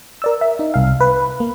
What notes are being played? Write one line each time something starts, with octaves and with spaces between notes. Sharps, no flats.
A#4 D5 E6
E5
D#4
C2 F5
B4
A#3